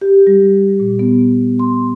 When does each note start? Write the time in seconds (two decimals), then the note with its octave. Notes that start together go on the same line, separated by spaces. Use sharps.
0.01 G4
0.27 G3
0.80 A#2
0.99 B3
1.59 C6